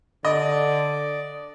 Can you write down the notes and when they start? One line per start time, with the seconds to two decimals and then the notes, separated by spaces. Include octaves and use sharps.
0.25 D3 D5 D#5